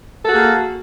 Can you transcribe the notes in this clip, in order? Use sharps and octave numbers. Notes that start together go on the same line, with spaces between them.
A#3 F#4 G#4 A4